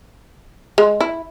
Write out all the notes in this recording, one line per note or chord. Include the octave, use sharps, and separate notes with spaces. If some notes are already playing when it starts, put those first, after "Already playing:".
G#3
E4